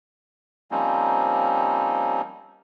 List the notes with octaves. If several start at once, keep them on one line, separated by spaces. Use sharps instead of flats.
F3 G3 A#3 C4 C#4 D#4